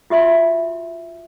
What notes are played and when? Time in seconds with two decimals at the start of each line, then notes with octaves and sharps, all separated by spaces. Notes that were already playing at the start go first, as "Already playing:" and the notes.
0.10 F4 F#4 E5 C6